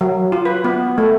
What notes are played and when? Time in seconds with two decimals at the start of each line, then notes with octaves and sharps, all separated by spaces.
0.01 F#3
0.32 F4
0.45 B4
0.65 B3
0.98 A3